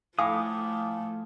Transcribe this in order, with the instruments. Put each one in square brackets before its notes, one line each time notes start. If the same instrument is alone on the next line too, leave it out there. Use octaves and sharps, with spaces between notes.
[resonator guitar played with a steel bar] A2 [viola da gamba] F3 A3 [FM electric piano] F5 G#5 [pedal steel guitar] D6 D#6